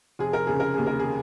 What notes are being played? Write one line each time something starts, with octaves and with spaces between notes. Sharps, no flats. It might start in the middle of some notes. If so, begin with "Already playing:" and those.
F1 G#4
A#4
C#3 G#4
A#4
D#2 G#4
A#4
G#4